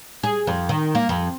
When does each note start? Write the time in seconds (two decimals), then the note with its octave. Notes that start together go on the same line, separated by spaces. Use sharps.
0.24 G#4
0.47 F2
0.69 D#3
0.95 A#3
1.09 F2